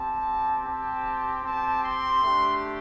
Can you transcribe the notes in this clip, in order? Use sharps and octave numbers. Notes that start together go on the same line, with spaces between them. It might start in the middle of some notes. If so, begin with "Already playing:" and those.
Already playing: C4 G4 A5
C4 G4 A5
C4 G4 A5
C6
A3 D4 G4